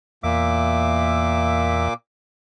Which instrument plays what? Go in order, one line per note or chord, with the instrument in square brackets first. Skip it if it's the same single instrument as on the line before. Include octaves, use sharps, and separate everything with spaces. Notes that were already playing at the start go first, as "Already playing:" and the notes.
[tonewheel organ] E2 E5 [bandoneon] A#2 A#3 D6